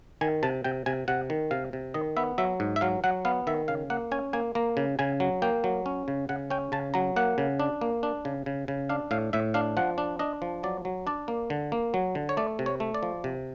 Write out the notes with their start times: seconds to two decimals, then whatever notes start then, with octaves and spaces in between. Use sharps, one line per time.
0.21 D#3 G#5
0.43 C3 A5
0.64 C3 G5
0.86 C3 G#5
1.08 C3 F#5
1.30 D#3
1.51 C3 F5
1.73 C3
1.94 D#3 D#5
2.17 B3 E5
2.38 F#3 E5
2.60 G#2
2.76 E5
2.81 F#3 F5
3.04 F#3 F#5
3.25 B3 F5
3.47 D#3 E5
3.68 C#3 F5
3.90 A#3 F#5
4.12 C#4 G#5
4.33 A#3 G#5
4.55 A#3 A#5
4.77 C#3
4.99 C#3 G#5
5.20 F#3
5.42 A#3 G5
5.64 F#3
5.86 C#4
6.08 C#3
6.29 C#3 F#5
6.50 C#4 G5
6.72 C#3 A5
6.94 F#3 A#5
7.16 A#3 F#5
7.38 C#3
7.60 D4
7.81 A#3
8.03 D4
8.25 C#3
8.46 C#3
8.68 C#3
8.89 D4 F5
9.11 A2 F5
9.33 A2 E5
9.54 D4 F5
9.77 F3 F#5
9.98 D4
10.19 D4 D#5
10.42 F3
10.63 F#3 D5
10.85 F#3
11.07 D4 D5
11.28 A#3
11.50 D3
11.72 A#3
11.94 F#3
12.15 D3
12.29 C#5
12.37 A3 D5
12.59 C3
12.66 C#5
12.80 A3
12.94 D5
13.03 F3
13.24 C3